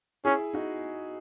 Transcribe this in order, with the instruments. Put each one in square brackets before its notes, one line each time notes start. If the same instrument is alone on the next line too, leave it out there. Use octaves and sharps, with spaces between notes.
[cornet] C#4 [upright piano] E4 G#4
[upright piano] D#4 F#4